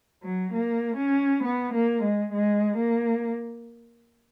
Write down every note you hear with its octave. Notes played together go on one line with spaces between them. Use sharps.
F#3
A#3
C#4
B3
A#3
G#3
G#3
A#3